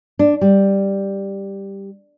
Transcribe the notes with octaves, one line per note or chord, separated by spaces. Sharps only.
D4
G3